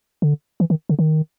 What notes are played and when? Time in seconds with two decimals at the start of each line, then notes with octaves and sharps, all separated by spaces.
0.22 D3
0.60 E3
0.70 D#3
0.89 D3
0.99 D#3